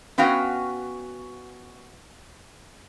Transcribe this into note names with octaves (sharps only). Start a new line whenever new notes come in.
B3 C#4 F#4 F5 G5